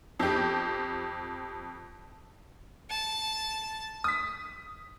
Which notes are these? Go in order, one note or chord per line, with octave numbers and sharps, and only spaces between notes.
F2 G4
A5
D#6 B6